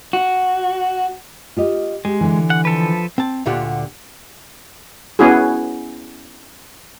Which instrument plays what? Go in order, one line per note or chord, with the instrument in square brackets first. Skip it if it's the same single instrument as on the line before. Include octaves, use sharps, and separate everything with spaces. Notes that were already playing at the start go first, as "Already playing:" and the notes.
[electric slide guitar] F#4
[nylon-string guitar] F4 G4 D#5
[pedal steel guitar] G#3 [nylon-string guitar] G4
[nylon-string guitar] D3 E3
[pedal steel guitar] F#5
F3 A4 B4
[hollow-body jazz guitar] C4 A5
D2 A#2 D3 F4 G4 F#5
[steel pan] B3 C#4 E4 F#4 G#4